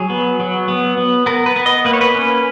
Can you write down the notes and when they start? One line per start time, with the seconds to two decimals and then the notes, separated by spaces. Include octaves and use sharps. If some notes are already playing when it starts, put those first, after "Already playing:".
Already playing: F#3 G#4
0.10 B3
0.40 F#3
0.68 B3
0.98 B3
1.26 B3 A#4
1.46 B4
1.56 B3
1.66 D#5
1.85 A#3 B4
1.93 C#5
2.01 B4
2.14 C#4